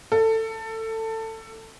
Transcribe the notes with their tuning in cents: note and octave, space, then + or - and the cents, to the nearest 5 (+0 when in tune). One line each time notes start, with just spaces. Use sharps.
A4 +20